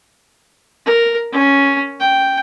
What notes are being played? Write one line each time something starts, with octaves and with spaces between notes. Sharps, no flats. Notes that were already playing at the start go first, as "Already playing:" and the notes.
A#4
C#4
G5